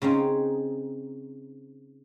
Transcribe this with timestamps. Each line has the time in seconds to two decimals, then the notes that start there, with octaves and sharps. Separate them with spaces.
0.02 C#3 C4 C#4 D#4